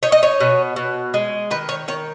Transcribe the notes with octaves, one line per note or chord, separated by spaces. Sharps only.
D#4 C#5
D#5
C#5
B2
B2
G#3
D#3 B4
C#5
D#3 C#5